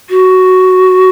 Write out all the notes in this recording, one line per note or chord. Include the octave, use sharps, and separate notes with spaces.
F#4